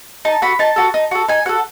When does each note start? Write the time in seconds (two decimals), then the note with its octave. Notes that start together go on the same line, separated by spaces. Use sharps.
0.25 D#4 A5
0.42 F#4 A4 B5
0.59 D#4 A5
0.76 F#4 A4
0.94 D#4
1.11 F#4 A4
1.28 D#4 G#5
1.46 F#4 A4 F#5